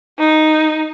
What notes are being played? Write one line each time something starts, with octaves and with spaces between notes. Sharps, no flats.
D#4